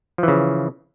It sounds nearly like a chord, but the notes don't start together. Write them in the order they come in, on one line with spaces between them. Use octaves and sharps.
F3 E3 C#3